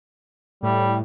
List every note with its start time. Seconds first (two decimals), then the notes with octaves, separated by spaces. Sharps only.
0.63 A2 G3